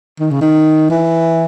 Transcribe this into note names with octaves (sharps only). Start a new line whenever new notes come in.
D#3
C#3
D#3
E3